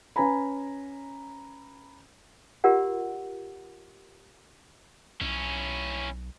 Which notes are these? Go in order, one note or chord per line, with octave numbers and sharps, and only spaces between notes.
C#4 B4 G#5 A#5 B5
F4 G4 A#4 D5 F#5
B1 C#4 E4